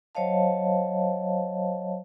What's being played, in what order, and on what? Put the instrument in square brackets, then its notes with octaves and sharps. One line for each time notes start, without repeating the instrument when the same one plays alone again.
[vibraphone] F#3 C5 C#5 D#5 F5 A5